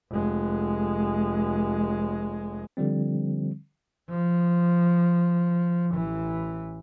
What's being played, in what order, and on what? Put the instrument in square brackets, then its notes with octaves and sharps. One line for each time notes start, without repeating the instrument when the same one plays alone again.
[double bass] F1 G#3
[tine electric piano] D3 F3 G3 C4
[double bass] F3
A1 E3